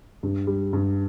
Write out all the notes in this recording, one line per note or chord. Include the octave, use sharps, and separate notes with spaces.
G2
G3
G2